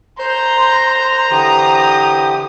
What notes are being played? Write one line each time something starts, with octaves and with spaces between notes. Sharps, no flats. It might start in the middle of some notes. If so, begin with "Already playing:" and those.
C5 A#5 C6 G6
D3 E3 G4 D#6